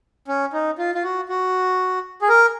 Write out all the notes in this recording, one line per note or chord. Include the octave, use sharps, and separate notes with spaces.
C#4
D#4
F4
F4
F#4
F#4
G#4
A#4